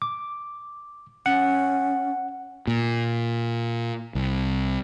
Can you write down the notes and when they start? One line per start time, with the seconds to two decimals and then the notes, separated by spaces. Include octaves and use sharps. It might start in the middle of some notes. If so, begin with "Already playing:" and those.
0.02 D6
1.26 C#4 F#5
2.67 A#2
4.15 C2